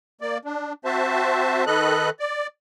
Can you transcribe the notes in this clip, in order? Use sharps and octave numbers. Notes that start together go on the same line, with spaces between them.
A#3 D5
D4
C4 F#4 C5 E5 A5
D#3 A4 B4 D#5 F#6
D5